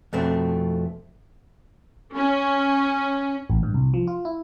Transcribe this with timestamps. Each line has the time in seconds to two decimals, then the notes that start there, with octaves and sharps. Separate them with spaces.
0.13 F2 B2 A3 C4
2.16 C#4
3.50 A1
3.63 G2
3.74 C2
3.94 F3
4.07 F4
4.25 E4